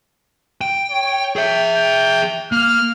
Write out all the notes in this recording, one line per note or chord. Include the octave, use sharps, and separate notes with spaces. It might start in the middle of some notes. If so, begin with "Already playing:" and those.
G5
C#5
G#4 E5 G5
G5
A#3 F6